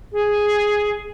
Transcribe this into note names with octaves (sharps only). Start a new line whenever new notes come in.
G#4